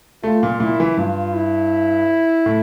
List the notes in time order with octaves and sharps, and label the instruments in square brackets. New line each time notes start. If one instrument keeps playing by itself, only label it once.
[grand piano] A3 [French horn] F4
[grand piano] A#2
[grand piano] A#2 [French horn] E4
[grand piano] E3
[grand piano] G2 [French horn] F4
[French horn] E4
[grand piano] A2